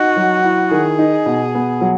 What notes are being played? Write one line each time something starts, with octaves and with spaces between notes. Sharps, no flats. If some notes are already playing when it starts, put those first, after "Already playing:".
Already playing: D#4 F#4
F#3
E4
D#3 G#4
D#4
B2
B3
F#3